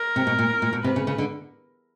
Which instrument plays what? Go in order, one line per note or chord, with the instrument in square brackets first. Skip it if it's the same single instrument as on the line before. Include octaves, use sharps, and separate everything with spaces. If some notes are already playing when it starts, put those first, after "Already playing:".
Already playing: [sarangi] A#4
[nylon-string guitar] C3
B2
A#2
A#2
B2
[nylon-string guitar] C3 [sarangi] B4
[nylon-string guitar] C#3
C#3
D3